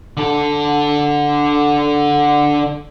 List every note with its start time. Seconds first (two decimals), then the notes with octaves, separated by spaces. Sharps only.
0.17 D3 A4